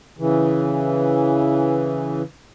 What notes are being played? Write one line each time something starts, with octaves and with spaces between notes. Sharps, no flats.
C#3 E3